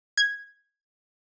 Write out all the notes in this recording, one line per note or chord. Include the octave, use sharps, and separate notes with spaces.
G#6